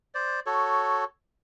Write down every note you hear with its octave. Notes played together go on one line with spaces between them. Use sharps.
C5 D5
F#4 A4 C#5